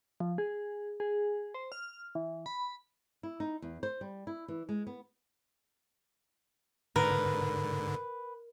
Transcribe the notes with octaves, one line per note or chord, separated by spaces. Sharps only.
F3
G#4
G#4
C5
F6
E3
B5
E4
D#4
E2
C5
G3
E4
E3
G#3
B3
G#2 D3 A#4 B4